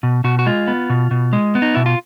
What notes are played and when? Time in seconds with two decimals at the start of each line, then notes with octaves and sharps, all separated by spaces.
0.03 B2
0.24 B2 F#4
0.39 F#4
0.46 G#3 F4
0.68 B3
0.90 B2
1.11 B2
1.33 G#3
1.55 B3
1.62 D#4
1.75 B2 E4
1.86 F4